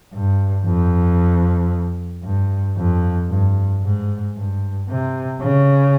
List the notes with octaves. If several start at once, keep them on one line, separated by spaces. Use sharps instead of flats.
G2
F2
G2
F2
G2
G#2
G2
C3
C#3